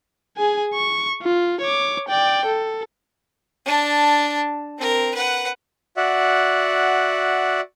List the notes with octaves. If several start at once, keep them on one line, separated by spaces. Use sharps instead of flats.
G#4 G#5
C#6
F4
C#5 D6
D5 G5
A4
D4 A5
C4 A#4
B4 F#5
F#4 D5 E5 F#5